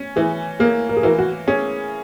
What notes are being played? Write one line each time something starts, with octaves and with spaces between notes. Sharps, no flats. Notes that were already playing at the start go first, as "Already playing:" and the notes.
Already playing: C#4
E3 G#4
A#3 G#4
A#4
G#4
E3 F#4 A#4
F#4
C#4 G#4